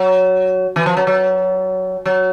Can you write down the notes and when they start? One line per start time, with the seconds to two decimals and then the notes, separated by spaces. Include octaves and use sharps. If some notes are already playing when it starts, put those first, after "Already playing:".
Already playing: F#3
0.76 E3
0.86 F3
0.97 F#3
1.07 F#3
2.06 F#3